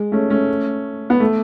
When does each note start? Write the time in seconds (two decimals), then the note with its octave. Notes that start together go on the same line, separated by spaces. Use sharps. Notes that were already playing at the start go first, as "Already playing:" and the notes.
Already playing: G#3
0.12 A3 C#4
0.30 A3 C#4
1.10 B3
1.20 A3